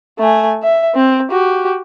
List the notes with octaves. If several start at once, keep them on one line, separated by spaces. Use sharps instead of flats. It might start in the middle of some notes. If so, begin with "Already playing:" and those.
A3 G#5
E5
C4
F#4 G4